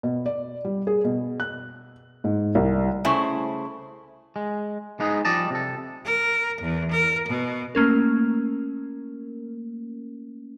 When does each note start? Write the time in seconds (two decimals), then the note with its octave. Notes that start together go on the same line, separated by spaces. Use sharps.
0.03 B2
0.26 D5
0.65 G3
0.87 G#4
1.04 B2
1.40 F#6
2.24 G#2
2.55 C2
3.05 C#3 A3 E4 C5
4.36 G#3
5.00 G#3 B3 D#4 G#4
5.25 F3 G3 D5 D#5 A5
5.50 C3 A4
6.05 A#4
6.61 E2
6.91 A#4
7.28 B2
7.75 A3 A#3 C#4 A#4